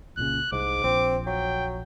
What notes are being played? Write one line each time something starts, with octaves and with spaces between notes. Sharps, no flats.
C2 A#2 C#3 F#6
C2 G#2 D6
A#1 C4
F#3 G5